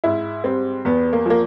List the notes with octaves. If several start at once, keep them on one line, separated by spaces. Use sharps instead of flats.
G#2 E4
G3 C4
E2 B3
A#3
F3 A#3